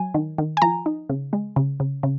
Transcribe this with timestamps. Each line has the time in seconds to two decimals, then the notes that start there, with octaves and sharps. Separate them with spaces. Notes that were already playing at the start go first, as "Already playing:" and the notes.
Already playing: F#3 G#5
0.14 D#3
0.38 D#3
0.57 G#5
0.62 F3 A#5
0.86 D#4
1.09 C#3
1.33 G#3
1.56 C#3
1.80 C#3
2.03 C#3